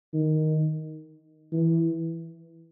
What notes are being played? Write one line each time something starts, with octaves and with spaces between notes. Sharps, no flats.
D#3
E3